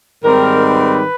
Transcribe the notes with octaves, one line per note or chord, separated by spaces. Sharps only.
G#2 D#3 G3 C4 A#4
B4